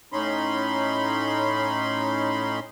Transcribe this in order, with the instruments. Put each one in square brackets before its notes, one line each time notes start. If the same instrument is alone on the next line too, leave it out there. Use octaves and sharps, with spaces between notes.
[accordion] A2 C#4 D#4 B5 C6